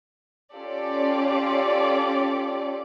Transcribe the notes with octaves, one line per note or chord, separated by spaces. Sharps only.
C#4 F4 G4 A4 D5